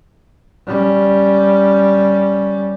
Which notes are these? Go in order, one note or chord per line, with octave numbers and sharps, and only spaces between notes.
G3 C#4